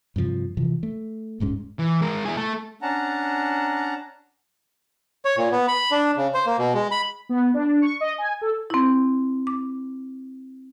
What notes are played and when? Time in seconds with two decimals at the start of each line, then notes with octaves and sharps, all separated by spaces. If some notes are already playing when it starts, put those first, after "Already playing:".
0.16 G2 C3 E3 F3
0.57 C3 E3 F3
0.83 A3
1.40 D1 G#2 G#3 C#4
1.79 E3
2.01 G#3 A#4
2.25 E4 G#4
2.37 A3 A4
2.82 C#4 D4 F#5 A5 A#5
5.25 C#5
5.37 A#2
5.52 B3
5.68 B5
5.91 D4
6.17 C#3
6.34 C5
6.46 A#3
6.59 B2
6.74 G#3
6.91 B5
7.29 B3
7.54 D4
7.82 C#6
8.00 D#5
8.18 G#5
8.41 A4
8.70 C4 E4
9.47 D6